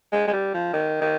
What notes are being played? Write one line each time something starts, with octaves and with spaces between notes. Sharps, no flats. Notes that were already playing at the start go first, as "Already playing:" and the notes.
G#3
G#3
G3
F3
D#3
D#3